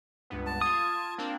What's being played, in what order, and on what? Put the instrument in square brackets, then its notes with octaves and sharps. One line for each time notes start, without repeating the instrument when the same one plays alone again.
[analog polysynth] C#2 G2 B3
[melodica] A5
[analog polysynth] F4 G#6 [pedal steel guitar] D#6
[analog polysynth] A#3 C4 D4